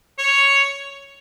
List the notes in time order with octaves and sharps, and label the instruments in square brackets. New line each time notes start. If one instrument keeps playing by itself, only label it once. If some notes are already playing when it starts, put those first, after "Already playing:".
[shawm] C#5